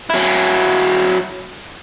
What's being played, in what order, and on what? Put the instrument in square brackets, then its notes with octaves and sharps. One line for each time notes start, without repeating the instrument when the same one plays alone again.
[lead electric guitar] F#3 E4